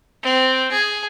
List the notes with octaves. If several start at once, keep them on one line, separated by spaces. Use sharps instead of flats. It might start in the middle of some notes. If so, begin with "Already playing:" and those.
C4
G#4